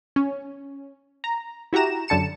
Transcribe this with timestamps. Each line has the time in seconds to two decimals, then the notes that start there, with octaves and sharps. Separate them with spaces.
0.16 C#4
1.24 A#5
1.73 E4 F#4 G4 A#5 E7
2.08 F#2 D3 A5 C#7 E7